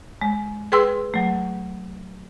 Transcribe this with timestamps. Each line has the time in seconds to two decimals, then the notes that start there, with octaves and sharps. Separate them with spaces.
0.21 G#3
0.72 G#4 B4 G5 C6 E6
1.14 F#3 A3